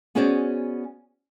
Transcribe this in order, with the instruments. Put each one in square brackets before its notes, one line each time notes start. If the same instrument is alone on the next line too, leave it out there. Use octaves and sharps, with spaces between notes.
[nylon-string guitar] B3 C#4 F#4 G#4 C5 D5